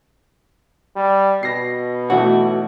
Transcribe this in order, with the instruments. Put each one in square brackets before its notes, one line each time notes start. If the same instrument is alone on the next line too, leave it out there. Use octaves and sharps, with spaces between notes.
[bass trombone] G3
[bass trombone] B2 [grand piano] A#6 C7
[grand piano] B1 E3 A3 [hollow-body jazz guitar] F#4